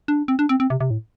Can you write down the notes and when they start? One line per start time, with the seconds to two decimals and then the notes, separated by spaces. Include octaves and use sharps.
0.08 D4
0.28 C4
0.39 D4
0.49 C4
0.60 C4
0.70 C3
0.80 C3
0.91 A2